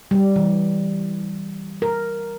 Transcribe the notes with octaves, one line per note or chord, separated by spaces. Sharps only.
G3
E3
A#4